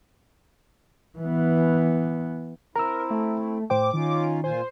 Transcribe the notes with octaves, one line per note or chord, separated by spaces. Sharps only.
E3 B3
C4 E4 A#4 A#5 E6
A3
A2 C5 G5 D6
D#3 C#4 D#4 F4
A#2 F4 C5 G#5